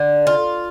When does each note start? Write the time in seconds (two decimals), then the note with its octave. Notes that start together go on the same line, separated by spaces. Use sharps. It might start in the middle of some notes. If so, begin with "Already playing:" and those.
Already playing: D3
0.27 F4